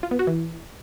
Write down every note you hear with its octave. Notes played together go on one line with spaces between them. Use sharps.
F4
B3
F#4
E3